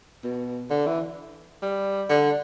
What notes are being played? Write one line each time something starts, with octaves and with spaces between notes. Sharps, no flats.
B2
D3
E3
G3
D3